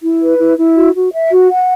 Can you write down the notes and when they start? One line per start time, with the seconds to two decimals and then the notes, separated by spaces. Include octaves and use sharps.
0.02 E4
0.21 B4
0.39 E4
0.58 E4
0.75 F#4
0.94 F#4
1.12 E5
1.30 F#4
1.48 F#5